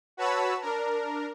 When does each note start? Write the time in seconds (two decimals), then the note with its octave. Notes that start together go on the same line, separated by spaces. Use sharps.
0.17 F#4 B4 C#5 A5 B5 E6
0.61 D4 A#4